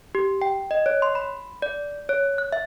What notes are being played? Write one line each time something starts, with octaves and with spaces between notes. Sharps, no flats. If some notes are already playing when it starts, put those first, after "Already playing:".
G4
G5
D#5
C#5
C6
B5
D5
C#5
F#6
E5